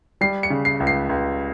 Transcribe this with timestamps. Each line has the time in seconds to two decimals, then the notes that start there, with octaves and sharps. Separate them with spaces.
0.21 G3 C7
0.43 C#7
0.50 C#3
0.65 C7
0.80 C#2
0.87 C7
1.09 C#2